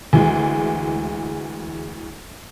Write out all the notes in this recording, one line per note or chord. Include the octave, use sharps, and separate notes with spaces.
D2 E3 G#3